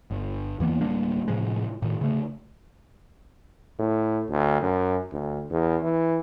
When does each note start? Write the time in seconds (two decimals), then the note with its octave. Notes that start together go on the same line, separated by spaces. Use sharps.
0.11 G1
0.60 E2 E3 A#3 B3
0.81 D1 G3 A#3 D4
1.28 A2 C3 F3 G#3
1.82 A2 D#3
2.01 C#3 A3
3.79 A2
4.30 D2
4.62 F#2
5.12 D2
5.50 E2
5.83 E3